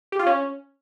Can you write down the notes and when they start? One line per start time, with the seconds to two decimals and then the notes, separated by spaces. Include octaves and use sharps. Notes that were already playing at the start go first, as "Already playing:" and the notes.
0.12 G4
0.19 F4
0.27 C#4